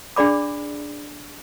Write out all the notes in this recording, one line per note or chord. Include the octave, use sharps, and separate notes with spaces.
D4 G#4 D5 B5 D6